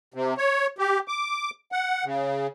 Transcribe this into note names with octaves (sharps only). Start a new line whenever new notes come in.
C3
C#5
G4
D6
F#5
C#3